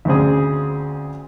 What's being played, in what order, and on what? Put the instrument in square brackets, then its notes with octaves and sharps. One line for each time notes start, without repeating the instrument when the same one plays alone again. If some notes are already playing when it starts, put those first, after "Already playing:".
[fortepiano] D2 C#3 C4 G#4